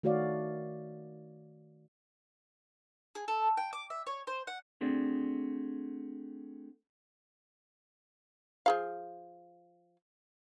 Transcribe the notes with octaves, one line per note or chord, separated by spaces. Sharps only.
D#3 A3 F#4 C#5 D5 F5
G#4
A4
G5
D6
E5
C#5
C5
F#5
A3 C4 D4 F#4 G#4 D5
F3 G#4 F5